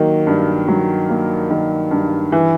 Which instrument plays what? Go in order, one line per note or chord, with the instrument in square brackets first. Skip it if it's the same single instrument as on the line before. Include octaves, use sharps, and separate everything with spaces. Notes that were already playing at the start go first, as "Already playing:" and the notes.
Already playing: [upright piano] D#3 F#3 A#3
G2
F#3
A#3
D#3
G2
E3